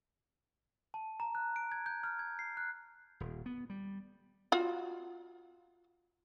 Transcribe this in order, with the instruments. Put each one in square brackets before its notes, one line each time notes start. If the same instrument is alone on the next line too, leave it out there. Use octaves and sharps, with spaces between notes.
[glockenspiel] A5
A#5
F#6
D7
G#6
G6
F6
G#6
C7
F#6
[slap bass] D#1
B3
G3
[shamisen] F4 F#4